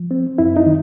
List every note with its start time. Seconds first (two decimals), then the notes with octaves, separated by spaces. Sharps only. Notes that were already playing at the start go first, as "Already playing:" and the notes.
Already playing: F3
0.11 C4
0.38 F#2 E4
0.57 D#4
0.66 D#3